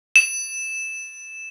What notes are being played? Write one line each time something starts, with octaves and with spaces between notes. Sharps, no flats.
E7